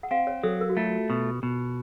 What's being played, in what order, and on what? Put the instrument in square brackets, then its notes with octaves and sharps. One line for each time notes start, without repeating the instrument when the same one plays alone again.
[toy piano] F#5
[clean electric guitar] C4 [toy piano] F5
[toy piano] C#5
[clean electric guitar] F#3 [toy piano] A4
[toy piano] A#4
F#4
[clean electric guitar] A3 [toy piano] F4
[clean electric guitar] B2
B2